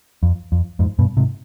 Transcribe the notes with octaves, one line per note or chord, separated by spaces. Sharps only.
F2
F2
F2 G#2
G2 B2
G#2 C3